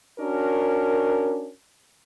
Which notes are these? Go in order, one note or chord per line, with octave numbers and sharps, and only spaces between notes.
C#4 D4 F#4 A#4